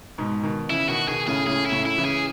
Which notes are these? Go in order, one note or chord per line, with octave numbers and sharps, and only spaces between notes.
G#2 B2
B2 D#3
C#3 E3 E4
B2 D#3 F#4
B2 D#3 G#4
A2 C#3 G#4
A2 C#3 G#4
E4
A2 C#3
E4
C#3 E3
G#4